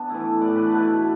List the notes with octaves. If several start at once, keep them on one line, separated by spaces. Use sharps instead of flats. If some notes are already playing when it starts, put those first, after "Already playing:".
Already playing: B3 D4
E3 A3 E4
A2 E3 A3 D4 D5
B4
B2 A3 E4 B4